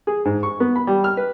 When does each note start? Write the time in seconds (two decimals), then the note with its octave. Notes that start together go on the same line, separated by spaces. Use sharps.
0.07 G#4
0.25 G#2
0.43 C#6
0.60 B3
0.76 B5
0.87 G3
1.04 F6
1.17 B4